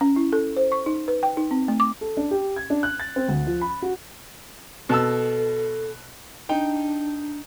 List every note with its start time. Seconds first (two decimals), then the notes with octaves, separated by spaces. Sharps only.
0.01 C#4
0.16 E4
0.32 A4
0.56 C5
0.72 C#6
0.86 D#4
1.08 B4
1.23 G5
1.37 D#4
1.51 C4
1.68 A3
1.80 D6
2.01 A4
2.17 D4
2.31 G4
2.56 G#6
2.70 D4
2.83 F#6
3.00 A6
3.16 C4
3.28 D2
3.47 F3
3.61 B5
3.82 F#4
4.89 B2 A4 A5 E6
6.49 D4 D#4 G5